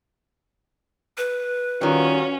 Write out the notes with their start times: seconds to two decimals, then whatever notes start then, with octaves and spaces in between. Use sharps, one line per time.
1.17 B4
1.81 D#3 G3 C#4 F4 F#4 F#5